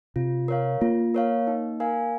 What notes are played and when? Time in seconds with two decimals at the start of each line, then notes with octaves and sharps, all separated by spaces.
0.16 C3 F4
0.48 A#4 C#5 F5
0.81 A#3 F4
1.14 A#4 C#5 F5
1.47 D#4
1.80 A#4 F5 G#5